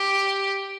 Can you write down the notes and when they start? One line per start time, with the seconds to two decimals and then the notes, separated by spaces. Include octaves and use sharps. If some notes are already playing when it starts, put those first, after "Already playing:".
Already playing: G4